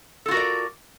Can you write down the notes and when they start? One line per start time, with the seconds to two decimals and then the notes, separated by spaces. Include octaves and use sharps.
0.26 A4
0.28 F4
0.31 F#4
0.34 A#4
0.37 D5